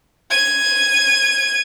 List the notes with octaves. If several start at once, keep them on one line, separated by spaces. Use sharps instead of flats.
G#6 D#7